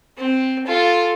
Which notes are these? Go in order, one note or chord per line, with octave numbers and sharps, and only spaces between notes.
C4
F4 A4